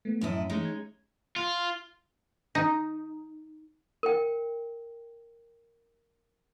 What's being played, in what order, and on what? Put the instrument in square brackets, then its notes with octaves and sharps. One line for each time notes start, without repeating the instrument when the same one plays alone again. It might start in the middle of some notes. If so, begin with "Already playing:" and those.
[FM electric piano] A3 B3
[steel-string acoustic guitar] F#2 A2 E4 [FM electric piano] C#4 D#5 D#6
[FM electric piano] E3 A3 [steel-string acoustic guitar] G#3 C#4 D#4
[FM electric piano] G#6
[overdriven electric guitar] F4
[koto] D#4
[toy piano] A#4 G5